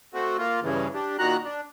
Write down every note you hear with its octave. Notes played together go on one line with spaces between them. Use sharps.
A3 C4 F#4
A#3 F4
G2 C#3 E3
D4 G4
A#2 D#3 F#4 A#5 F#6
D4